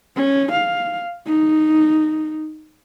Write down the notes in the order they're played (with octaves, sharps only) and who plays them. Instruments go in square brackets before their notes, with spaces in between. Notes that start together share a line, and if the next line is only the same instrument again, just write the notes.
[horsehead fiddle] C#4
F5
D#4